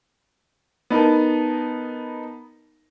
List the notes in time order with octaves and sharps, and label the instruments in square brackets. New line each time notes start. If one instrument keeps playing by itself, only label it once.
[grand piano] B3 D#4 A#4 A5